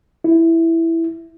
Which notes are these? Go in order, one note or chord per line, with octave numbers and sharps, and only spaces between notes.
E4